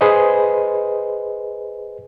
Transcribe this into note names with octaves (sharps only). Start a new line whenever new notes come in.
G#4 B4 C5 D#5